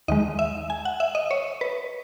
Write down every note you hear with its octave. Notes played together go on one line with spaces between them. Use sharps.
D#2 D#3 G#3 D#5
E5
G#5
F#5
E5
D#5
C#5
B4